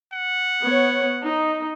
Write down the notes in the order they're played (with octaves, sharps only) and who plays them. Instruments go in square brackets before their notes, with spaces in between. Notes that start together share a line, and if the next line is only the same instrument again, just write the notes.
[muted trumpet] F#5
[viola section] B3 C#5
D#4